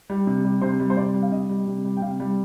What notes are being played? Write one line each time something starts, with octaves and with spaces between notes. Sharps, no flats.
G3
C3
G3
C3 C5
G3
C5
C3 D5
G3
F5
C3 D#5
G3
C3
G3
G5
C3 F5
G3